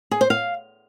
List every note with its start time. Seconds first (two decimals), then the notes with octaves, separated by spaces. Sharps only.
0.11 G#4
0.21 C5
0.30 F5